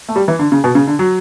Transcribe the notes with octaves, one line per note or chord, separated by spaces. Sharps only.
A3
G3
E3
D3
C#3
B2
C#3
D3
F#3